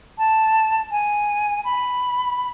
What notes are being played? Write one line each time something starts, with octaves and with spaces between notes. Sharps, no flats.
A5
G#5
B5